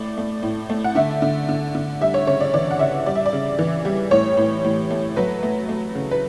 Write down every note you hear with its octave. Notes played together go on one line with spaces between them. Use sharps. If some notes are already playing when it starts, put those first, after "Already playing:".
Already playing: A2 A3 D5
A3
A2
A3
F#5
D3 E5
D3
D3
D3
G3 E5
C#5
C#3 C#5
D5
E3 D5
F#5
C#3 E5
G3 D5
E5
D5
C#3
E3
G3
A2 C#5
A2
A2
A3
F#3 B4
A3
A3
C#3
B4